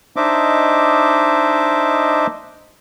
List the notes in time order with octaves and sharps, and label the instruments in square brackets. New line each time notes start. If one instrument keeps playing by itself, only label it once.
[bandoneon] D4 D#4 C5 D#5 E5 D6